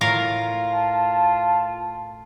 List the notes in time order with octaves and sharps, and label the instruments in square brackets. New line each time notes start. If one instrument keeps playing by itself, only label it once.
[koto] A2 A#4 F5 [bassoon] F4
[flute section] A5